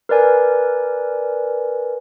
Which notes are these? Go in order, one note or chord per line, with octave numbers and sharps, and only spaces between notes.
A#4 B4 D5 G#5